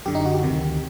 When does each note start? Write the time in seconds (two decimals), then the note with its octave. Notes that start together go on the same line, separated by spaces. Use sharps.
0.06 F#2 D3 G4
0.15 D#4
0.25 F#4
0.34 G4
0.43 D2 C3 D#3